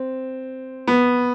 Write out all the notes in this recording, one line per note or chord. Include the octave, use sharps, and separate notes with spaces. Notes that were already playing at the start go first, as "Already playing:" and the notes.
Already playing: C4
B3